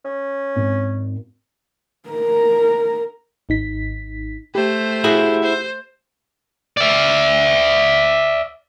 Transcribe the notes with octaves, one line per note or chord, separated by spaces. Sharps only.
C#4
G#1
A#4 A#5
G#1 D#4 B6
A3 G4 C5
E4 F#4 G#4
C5
D5 E5